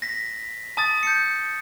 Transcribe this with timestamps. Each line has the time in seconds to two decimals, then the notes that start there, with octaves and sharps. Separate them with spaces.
0.02 A#6 B6
0.77 A5 D#6 A6
1.03 G6 C#7